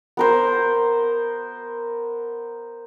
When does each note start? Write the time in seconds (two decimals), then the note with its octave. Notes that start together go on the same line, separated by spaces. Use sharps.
0.17 B3 A#4 C5